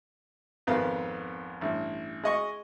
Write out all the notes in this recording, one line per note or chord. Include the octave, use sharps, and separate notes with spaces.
G#1 F2 B3 A#4 F5
A1 G2
G#3 D#5 C#6